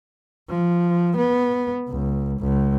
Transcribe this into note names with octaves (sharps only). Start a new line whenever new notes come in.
F3
B3
C#2
C#2